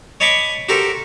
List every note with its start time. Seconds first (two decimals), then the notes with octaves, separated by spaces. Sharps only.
0.20 C#5 D#5 A5 B5 C#6 D6
0.69 F#4 G4 A4 A#4 C5